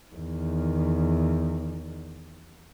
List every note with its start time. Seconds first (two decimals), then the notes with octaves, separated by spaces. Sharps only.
0.14 E2 D#3